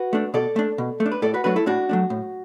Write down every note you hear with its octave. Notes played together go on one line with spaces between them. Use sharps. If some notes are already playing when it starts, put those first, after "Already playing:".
Already playing: F#4 B4
A3 D4
B2 A4 D5
A3 D4
B2
A3
D4
B4
A2 A4 D5
F#4 B4
F#3 A3 D4 F#4 B4
E4 A4
A2 D4 F#4
F#3 A3 D4
A2